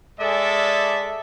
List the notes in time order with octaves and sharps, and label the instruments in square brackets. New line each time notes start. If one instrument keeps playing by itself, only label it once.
[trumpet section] G#3 G#4 A4 D5 E5